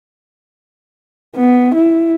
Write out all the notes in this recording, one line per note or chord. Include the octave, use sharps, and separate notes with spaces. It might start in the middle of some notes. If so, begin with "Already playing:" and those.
B3
E4